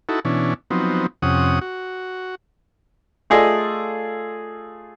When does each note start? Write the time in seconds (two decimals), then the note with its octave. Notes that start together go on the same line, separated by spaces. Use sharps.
0.09 D#4 E4 F#4 A4
0.25 B2 E3 C#4 D4
0.70 F3 F#3 B3 C4 D#4
1.22 F2 C3 C#4 F#5 D#6
1.61 F#4
3.30 A3 F4 G#4 A4 D5 D#5